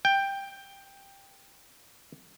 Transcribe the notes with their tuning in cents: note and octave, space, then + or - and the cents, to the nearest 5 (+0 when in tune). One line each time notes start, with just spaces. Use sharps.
G5 +10